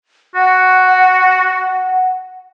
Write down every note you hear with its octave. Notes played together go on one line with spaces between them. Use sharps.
F#4 F#5